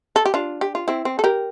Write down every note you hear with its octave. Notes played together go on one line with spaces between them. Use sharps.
A4
G4
D4 F4
G4
F4
C4 E4
C4
A4
G4 A#4